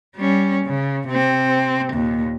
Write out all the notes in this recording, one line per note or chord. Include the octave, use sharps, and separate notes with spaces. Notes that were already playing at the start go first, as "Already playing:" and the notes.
G3 C#4
C#3
C3 C4
D#2 A#2